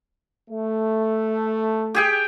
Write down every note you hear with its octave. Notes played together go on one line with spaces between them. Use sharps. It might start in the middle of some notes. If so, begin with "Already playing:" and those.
A3
G4 G#4 G5